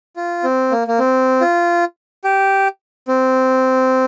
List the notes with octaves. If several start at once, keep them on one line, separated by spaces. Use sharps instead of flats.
F4
C4
A#3
A#3
C4
F4
G4
C4